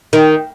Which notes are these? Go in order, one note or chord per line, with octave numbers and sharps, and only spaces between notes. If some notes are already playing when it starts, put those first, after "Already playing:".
D#3